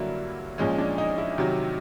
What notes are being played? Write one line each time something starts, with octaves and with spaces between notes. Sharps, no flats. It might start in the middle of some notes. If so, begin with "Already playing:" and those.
Already playing: G2 D3 F#3 A#3 E4
A#2 F3 G#3 C#4
D4
D#4
E4
C3 D#3 F#3